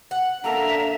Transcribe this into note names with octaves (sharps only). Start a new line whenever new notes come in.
F#5
A#3 D4 A4 A#4 E5 A#5